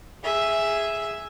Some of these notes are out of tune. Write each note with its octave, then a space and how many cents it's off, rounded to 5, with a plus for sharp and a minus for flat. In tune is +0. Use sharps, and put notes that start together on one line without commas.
G#4 +0 E5 +0